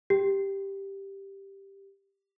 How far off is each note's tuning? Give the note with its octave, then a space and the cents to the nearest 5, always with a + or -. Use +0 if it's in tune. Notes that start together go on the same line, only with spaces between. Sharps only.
G4 +0